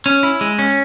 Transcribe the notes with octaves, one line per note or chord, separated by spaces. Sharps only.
C#4
E4
G#3
C#4